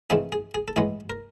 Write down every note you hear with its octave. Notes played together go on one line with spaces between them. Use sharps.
C#3 E3 A3 C4 D#4 G#4
G#4
G#4
A4
A2 E3 G#3 B3 G#4
A#4